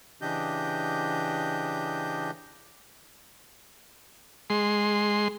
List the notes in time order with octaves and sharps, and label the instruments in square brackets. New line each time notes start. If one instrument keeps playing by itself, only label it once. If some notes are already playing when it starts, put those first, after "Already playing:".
[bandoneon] C#3 E3 D4 G4 D#5 G6
[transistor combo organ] G#3 C6